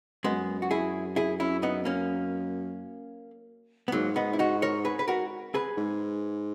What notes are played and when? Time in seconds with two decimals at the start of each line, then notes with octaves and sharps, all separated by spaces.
0.24 F#2 G#3 B3
0.62 F#4
0.71 E4 G#4
1.16 E4 G#4
1.40 C#4 E4
1.63 B3 D#4
1.85 A#3 C#4
3.88 B3
3.92 G#2 F#3 A#3
4.16 B3 D#4
4.33 E4
4.39 D#4 F#4
4.62 A#4 C#5
4.85 G#4 B4
4.99 B4
5.08 F#4 A#4
5.54 G#4 B4
5.77 G#2